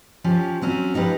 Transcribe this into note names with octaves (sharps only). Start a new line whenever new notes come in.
F3 C#4 G4
F#3 C4 C#4
F3 D#4 G4 A4 B4